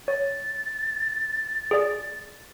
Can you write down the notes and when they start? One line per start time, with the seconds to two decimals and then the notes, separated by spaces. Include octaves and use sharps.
0.08 C#5 A6
1.71 G#4 D5